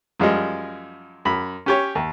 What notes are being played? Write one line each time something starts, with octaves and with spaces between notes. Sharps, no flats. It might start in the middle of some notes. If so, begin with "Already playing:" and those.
F#2 F3 G3 G#3
F#2 B5
C#4 G4 C#5
D#2